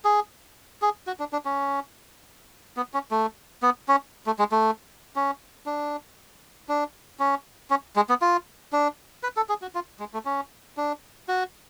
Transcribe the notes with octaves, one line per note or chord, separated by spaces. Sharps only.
G#4
G#4
F#4
D4
D4
C#4
B3
C#4
A3
B3
C#4
A3
G#3
A3
C#4
D4
D4
C#4
C#4
G#3
B3
F4
D4
B4
A4
G#4
F#4
F4
G#3
A3
C#4
D4
F#4